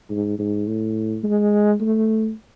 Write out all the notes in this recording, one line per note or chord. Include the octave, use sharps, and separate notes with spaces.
G#2
G#2
A2
G#3
A3